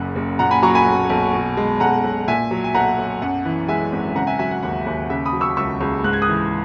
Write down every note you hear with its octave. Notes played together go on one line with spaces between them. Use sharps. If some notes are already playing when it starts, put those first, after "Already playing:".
Already playing: F#1 F#2 C#3 F#5
F#1
A#2 F#5 A#5
G#5 B5
F#3 A#5 C#6
G#5 B5
B1
B1
B2
G#3
B1 F#5 A#5
B1
A#2 E5 G#5
F#3
G#5
B1 F#5 A#5
B1
F#2 F#5
E3
G#3 E5 G#5
G#1
C#3 F#5 A#5
E5 G#5
F#3 E5 G#5
F#5
D#2 F#5
D#2
C#3 E5
B5 D#6
F#3
C#6 E6
C#2 C#6 E6
C#2
G#2 F#6
G#6
D#6 F#6
E3